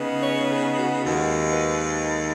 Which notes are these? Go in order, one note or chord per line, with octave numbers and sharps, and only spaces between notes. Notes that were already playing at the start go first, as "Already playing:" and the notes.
Already playing: C#3 B3 D#4
C#5
G#4
F#4
D#2 D#3 G#3 F#4
B4